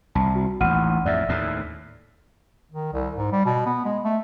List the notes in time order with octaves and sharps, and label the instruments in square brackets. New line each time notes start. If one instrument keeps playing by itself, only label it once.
[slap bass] C2 [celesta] A5
[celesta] F#4
[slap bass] A1 D#2 [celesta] F#5 F6 D#7
[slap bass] F2 A2 [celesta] D5 E5
[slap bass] D#2 A2
[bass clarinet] D#3
C2
G#2
G3
B2
B3
G#3
A3